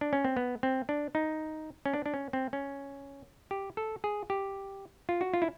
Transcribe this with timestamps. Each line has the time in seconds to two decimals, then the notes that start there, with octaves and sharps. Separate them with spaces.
0.01 D4
0.13 C#4
0.25 C4
0.37 B3
0.63 C4
0.89 D4
1.15 D#4
1.86 C#4
1.94 D4
2.06 D4
2.14 C#4
2.33 C4
2.53 C#4
3.51 G4
3.77 A4
4.04 G#4
4.30 G4
5.09 F4
5.21 F#4
5.34 F4
5.42 E4